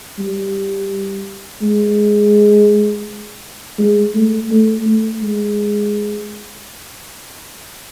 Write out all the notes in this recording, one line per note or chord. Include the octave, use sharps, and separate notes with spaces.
G3
G#3
G#3
A3
A3
A3
G#3